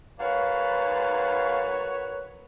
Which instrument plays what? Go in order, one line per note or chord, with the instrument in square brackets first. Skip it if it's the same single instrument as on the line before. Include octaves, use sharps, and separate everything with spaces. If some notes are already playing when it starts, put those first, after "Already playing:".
[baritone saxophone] G#2 [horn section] F#4 A#4 C#5 [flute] B4 [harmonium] F5